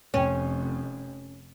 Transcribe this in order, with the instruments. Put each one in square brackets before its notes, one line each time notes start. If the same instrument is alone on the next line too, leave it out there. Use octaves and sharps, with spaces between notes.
[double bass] F1 F2 [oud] C#4